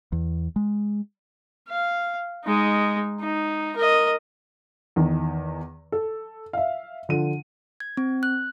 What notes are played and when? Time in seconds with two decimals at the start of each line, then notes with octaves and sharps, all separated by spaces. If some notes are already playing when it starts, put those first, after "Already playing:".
0.12 E2
0.56 G#3
1.69 F5
2.44 G#3 D#4
3.20 D#4
3.76 A#4 D#5
4.96 E2 D#3
5.92 A4
6.53 E5 F5
7.09 D3 F3 D#7
7.80 G#6
7.97 C4
8.23 F#6